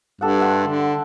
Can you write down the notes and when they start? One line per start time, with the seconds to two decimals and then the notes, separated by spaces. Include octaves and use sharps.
0.21 G2 G4 A4 F#5
0.39 E5 F#5 C6
0.67 D3